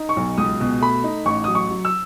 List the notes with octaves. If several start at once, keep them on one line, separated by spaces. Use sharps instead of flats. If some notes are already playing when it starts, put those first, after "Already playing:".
Already playing: D#4
C#6
B1
C#2 D#6
B2
A3 B5
D#4
A1 C#6
F#3 D#6
C#6
F#3
E6